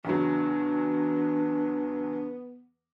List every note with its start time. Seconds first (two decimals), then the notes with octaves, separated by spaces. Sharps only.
0.05 E2 C#3 F#3 B3 D4